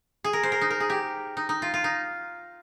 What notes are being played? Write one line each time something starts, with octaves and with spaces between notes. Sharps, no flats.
G#4
A#4
C5
A#4
D#4
A#4
G#4
G4
D#4
D#4
F4
F4
D#4